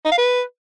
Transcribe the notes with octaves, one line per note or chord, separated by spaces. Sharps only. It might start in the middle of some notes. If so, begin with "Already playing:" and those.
D#4
F5
B4